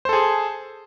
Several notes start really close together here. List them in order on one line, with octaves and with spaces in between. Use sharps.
C5 A4 G#4